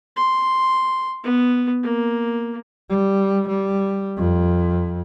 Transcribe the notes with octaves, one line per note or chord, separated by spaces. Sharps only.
C6
B3
A#3
G3
G3
F2